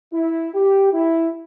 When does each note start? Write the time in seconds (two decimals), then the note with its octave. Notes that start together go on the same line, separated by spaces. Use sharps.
0.12 E4
0.54 G4
0.92 E4